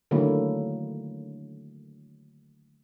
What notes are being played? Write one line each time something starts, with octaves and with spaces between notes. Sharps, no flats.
D3 D#3 F#3 A3 A#3 E4